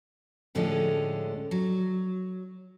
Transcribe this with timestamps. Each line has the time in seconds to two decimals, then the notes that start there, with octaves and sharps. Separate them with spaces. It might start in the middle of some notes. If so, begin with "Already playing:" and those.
0.55 D2 A2 D3 F3 G#3 C#4
1.51 F#3